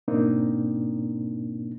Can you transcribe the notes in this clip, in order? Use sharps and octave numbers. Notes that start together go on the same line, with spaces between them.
G#2 B2 A#3 C4 D4 D#4